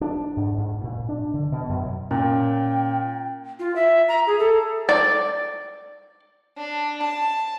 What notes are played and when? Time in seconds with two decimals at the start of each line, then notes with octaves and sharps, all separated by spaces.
0.01 D4
0.36 G#2
0.58 G#2
0.83 A#2
1.09 D4
1.34 D3
1.52 B2
1.69 F#2
2.11 A#2 C#4 G5
3.59 F4
3.76 E5
4.08 A#5
4.27 G#4
4.39 A4
4.89 D5
6.58 D4
7.04 A5